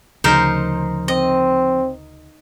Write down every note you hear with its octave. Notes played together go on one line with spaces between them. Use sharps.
D2 C#3 F3 D#4 A#4 C5
C4 D#5